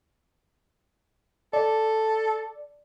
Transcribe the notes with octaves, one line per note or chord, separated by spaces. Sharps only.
A4 D5